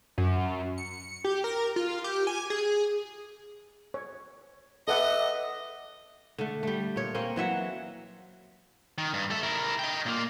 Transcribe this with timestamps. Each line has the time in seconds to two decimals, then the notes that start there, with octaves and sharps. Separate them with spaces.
0.18 F#2
0.78 C#7
1.24 G4
1.44 A#4
1.76 F4
2.04 G4
2.27 G#5
2.50 G#4
3.94 C#5
4.88 A4 B4 D#5 E5 F#5
6.38 D3 A3
6.63 G3 A3
6.96 A#2 C#5
7.15 A#3 C4 C#4
7.36 E3 F#3 E5 F#5
8.98 D#3
9.14 G2
9.30 A4 E5
9.43 E4 A#4
9.79 D#5 G5
10.06 A#2 A#3